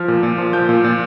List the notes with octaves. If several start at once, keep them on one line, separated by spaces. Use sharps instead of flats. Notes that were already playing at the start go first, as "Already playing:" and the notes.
Already playing: F3 F6
A#2
A#2
F3
F3 G6
A#2
A#2